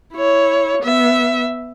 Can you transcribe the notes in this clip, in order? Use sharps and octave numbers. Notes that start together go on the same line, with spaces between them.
E4 C#5
B3 E5